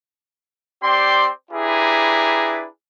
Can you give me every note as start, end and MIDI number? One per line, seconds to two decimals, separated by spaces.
0.83 1.30 60
0.83 1.30 67
0.83 1.30 72
0.83 1.30 74
0.83 1.30 84
1.52 2.67 62
1.52 2.67 64
1.52 2.67 67
1.52 2.67 68
1.52 2.67 71
1.52 2.67 82